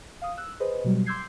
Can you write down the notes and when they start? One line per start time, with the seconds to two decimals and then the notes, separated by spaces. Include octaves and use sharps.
0.22 F5 D#6
0.37 E6 F#6
0.60 G#4 B4 C5 D#5
0.84 B2 F#3 G3
1.06 C6 D6 E6 G6 G#6 C7